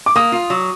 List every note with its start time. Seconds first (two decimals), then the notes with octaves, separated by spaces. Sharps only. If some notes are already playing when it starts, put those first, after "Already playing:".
0.06 D6
0.16 A#3 D#6
0.32 F4
0.50 F#3